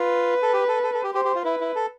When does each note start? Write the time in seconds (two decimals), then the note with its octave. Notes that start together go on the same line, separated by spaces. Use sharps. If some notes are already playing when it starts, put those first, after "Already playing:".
Already playing: F4 B4
0.42 A4
0.53 G4
0.68 A4
0.84 A4
0.94 A4
1.04 G4
1.14 G4 C5
1.25 G4
1.35 F4
1.45 E4 B4
1.61 E4
1.75 A4